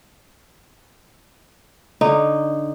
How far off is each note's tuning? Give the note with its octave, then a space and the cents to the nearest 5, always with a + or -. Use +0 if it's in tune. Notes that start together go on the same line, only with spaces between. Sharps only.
D3 -20 D#4 -15